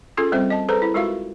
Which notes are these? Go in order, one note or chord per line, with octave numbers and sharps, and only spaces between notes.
C#4 F4 G#4 A4
G3 C4 C5 E5
D#5 A5
G#4 A4 B4 C5 A#5
E4
G#3 F4 F#4 A#4 E5 F5